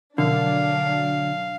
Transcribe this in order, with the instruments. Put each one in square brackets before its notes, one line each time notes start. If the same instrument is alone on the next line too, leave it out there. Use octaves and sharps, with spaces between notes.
[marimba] B2 F3 [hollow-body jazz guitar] D3 [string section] F#3 D4 [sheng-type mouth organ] F5